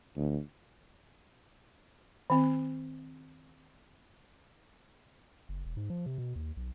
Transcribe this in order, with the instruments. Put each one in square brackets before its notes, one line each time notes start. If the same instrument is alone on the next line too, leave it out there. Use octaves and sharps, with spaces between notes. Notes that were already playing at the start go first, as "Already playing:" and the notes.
[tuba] D2
[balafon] D#3 C4
[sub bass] F#1
E1
G#2
F3
C3
B2
D#2
B1